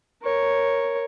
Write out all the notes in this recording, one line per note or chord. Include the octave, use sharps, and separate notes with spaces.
A#4 C#5